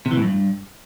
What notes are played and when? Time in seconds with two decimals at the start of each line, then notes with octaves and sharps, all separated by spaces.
0.06 C3
0.11 E3
0.17 A2
0.22 F#2
0.27 G2